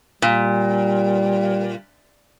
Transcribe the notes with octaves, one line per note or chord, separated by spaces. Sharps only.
A#2 G3